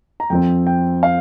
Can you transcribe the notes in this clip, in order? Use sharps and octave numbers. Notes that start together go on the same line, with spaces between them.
A#5
F2 F3 C4 G5
G5
F5